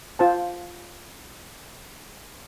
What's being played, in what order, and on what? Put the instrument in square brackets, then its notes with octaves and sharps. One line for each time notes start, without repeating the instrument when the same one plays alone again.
[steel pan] F4 C5 A5